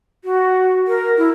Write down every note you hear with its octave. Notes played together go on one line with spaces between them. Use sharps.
F#4
A#4
E4